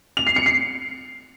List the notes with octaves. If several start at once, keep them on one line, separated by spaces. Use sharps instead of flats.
F7
C7
C#7
C7